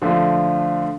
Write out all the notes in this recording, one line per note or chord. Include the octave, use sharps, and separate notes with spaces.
D3 F3 A3